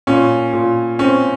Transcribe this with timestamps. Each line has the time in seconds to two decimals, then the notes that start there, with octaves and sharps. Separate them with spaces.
0.07 A#2 C#4
0.53 A#2
0.99 C4 C#4